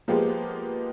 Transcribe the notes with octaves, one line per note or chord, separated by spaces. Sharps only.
F3 G#3 A#3 B3 G4